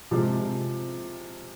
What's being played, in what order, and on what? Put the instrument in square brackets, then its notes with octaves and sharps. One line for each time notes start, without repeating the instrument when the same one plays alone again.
[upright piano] C3 F3 G#3